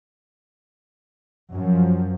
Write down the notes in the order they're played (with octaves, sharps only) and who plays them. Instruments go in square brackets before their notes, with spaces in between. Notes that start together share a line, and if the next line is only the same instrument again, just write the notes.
[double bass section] F#2 F3